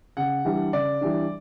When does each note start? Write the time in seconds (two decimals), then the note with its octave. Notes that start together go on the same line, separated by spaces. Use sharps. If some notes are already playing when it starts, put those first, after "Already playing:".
0.17 C#3 F#5
0.45 E3 G3 D4
0.73 C#3 D5
1.01 E3 G3 D4